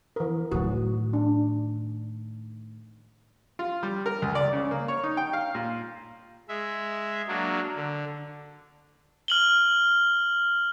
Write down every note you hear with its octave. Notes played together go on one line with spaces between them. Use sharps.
E3 A#4
A2 D#3 F#3 F#4
D4
F4
G3
A#4
C#2
D5
C#3
A#3
C#5
D#4
G5
F5
A#2
G#3 E5
F#3 A#3 D4
D3
F6 F#7 G7